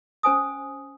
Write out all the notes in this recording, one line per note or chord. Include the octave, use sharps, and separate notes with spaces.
C#4 C5 G#5 D#6